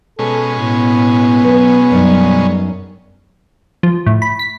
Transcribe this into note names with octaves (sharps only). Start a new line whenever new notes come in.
B2 G#3 C#4 A4
A2 B3
F#3 B4
F#2 G3 D#4
F3
A2
B5
B6